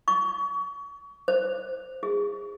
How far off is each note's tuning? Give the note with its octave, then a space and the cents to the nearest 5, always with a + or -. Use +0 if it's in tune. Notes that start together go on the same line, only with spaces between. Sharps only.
C#6 +30
C5 +0
G#4 -25